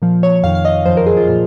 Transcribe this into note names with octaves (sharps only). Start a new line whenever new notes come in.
A#2 F3
C#5
F2 D#3 F5
F5
D#5
F#2 F3 C5
A#4
G#4
F4
A#2 F3 F4